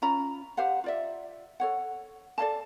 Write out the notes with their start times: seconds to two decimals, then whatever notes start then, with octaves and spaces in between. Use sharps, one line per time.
0.02 C#4 F4 A#5 B5
0.57 G4 C5 F5 F#5
0.84 F4 D5 E5
1.60 A4 C#5 F#5
2.38 A4 D5 F5 A5